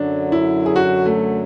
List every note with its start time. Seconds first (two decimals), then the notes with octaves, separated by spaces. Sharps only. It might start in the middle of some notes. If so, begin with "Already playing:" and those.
Already playing: F#2 D3 F#3 D4
0.32 E4
0.66 G#4
0.76 F#4
1.06 A3